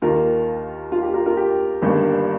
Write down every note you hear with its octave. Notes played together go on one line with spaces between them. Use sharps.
D#2 D#3 A#3 F4 A#4
F4
G4
F4 A#4
F4 A#4
G4
G1 G2 D#3 A#3